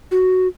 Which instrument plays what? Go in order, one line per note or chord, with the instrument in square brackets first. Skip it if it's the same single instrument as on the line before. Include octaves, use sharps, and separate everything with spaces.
[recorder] F#4